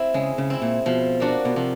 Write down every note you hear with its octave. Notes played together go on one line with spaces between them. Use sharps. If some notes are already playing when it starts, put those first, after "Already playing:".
Already playing: C4 E4
C#3 G#3
C#3
C4 E4
A#2
B2 F3
A#3 D4 F#4
B2
C3 F3